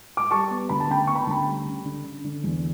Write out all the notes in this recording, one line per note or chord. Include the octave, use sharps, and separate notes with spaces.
D6
G3 A5 C#6
B3
D2 B5
A5
C#3 G5 B5
B3 C#6
B5
A5
D2 G5 B5
G3
C#3
D3
D3
D3
E2